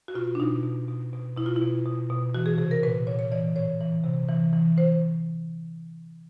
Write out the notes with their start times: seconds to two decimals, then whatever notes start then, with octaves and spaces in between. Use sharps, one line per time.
0.08 F#4
0.15 B2 F4
0.35 D4
0.40 B2 D#4
0.64 B2
0.89 B2
1.13 B2
1.36 B2 E4
1.46 F4
1.56 E4
1.62 B2
1.86 B2
2.10 B2
2.34 E3 F#4
2.46 G#4
2.58 C3 G#4
2.71 A#4
2.83 A#2 B4
3.07 A#2 C#5
3.19 C#5
3.32 E3 D5
3.55 A2 C#5
3.81 E3
4.04 C3
4.29 E3
4.53 E3
4.77 E3 C5